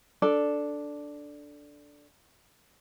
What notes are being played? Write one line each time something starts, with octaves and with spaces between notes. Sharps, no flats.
D4 A4 D5